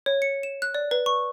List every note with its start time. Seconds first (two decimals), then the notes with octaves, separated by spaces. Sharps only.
0.06 C#5
0.22 C#7
0.43 E7
0.62 F#6
0.75 D5
0.91 B4
1.06 C#6